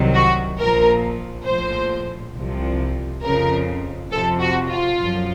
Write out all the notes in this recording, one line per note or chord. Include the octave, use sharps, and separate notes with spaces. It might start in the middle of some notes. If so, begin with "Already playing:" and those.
Already playing: C2 C3 D#3 F#3
F#4
A#1 A#2 F3 A#4
A#1 A2 F3 C5
C2 C3 F3
F2 C#3 F3 A#4
F2 C3 F3 A4
F#4
F4
F#2 F3